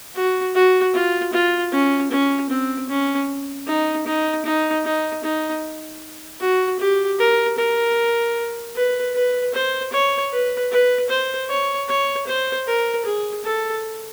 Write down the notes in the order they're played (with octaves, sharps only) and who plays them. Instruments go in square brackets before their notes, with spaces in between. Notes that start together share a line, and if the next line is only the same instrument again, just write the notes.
[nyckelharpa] F#4
F#4
F4
F4
C#4
C#4
C4
C#4
D#4
D#4
D#4
D#4
D#4
F#4
G4
A#4
A#4
B4
B4
C5
C#5
B4
B4
C5
C#5
C#5
C5
A#4
G#4
A4